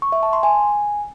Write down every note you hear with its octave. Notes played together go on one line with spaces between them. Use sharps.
C#6
E5
A5
C6
G#5